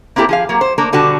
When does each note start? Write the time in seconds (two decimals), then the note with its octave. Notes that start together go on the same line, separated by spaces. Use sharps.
0.16 A#3 C4 E4 G4 A4 A#4
0.29 F3 G#4 F5
0.49 F#3 A#3
0.61 C5
0.78 A3 A#3 D4 A#4
0.92 B2 D3 G3 F#4 A5